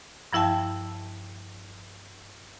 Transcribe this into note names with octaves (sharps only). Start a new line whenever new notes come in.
G2 F3 E4 E5 G5 A5